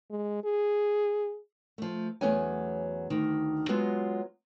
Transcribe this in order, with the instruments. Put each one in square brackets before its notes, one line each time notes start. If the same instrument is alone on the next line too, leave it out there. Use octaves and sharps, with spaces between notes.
[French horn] G#3
G#4
[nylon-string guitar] F3 A3
E2 F#3 A3 B3 C#4 G#5
D2 D#3
F#3 G#3 B3 F4 F#4